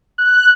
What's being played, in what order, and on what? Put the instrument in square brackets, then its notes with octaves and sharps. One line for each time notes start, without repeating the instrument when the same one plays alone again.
[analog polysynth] F#6